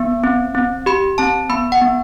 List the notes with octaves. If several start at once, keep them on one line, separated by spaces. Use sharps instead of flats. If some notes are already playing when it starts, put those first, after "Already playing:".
Already playing: B3
C4
C4
G4 B5
C4 A5
B3 B5
F#5
B3